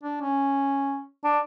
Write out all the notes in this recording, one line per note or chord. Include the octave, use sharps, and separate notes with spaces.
D4
C#4
D4